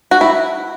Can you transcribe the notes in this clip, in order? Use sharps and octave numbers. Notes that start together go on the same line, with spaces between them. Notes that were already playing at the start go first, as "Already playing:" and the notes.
F#4
E4